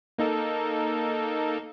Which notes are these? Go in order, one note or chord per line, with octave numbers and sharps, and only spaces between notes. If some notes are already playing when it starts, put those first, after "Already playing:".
A#3 D#4 A4